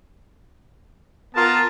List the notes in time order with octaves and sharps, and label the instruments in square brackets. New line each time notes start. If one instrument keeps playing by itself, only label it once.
[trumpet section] B3 F4 A5 [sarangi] A#4